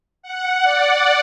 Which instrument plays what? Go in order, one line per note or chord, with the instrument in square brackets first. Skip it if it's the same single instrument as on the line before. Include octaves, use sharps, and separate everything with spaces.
[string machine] F#5
D5